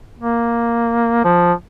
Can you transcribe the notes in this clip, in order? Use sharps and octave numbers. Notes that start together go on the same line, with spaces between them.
A#3
F3